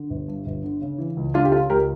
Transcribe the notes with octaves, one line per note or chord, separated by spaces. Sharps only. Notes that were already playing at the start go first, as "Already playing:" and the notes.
Already playing: D3
G1
G2
G1
D3
C#3
E3
C#2
C#2 D4 F4
G4
C#3 F4 A4
C#2 G4 A#4